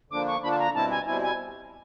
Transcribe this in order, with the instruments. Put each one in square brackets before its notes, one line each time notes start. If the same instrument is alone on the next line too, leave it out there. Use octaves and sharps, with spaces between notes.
[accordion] D3 F3 A#3 D4 [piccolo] D6
[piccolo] C#6
[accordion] D3 F3 A#3 D4 [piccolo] B5
[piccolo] A5
A#5
[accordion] B2 G3 C4 E4 [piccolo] A5
[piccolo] G#5
[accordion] B2 G3 C4 E4 [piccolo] G#5
[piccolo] G#5